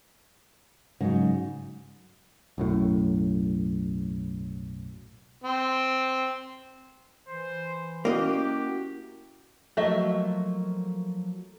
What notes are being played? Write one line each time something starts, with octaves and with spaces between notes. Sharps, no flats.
G#2 C#3 F#3
B1 F#2 A2
C4
E3 C5
A#3 C#4 E4 F#4 G4 D#5
F3 F#3 A3 A#3 D#5 E5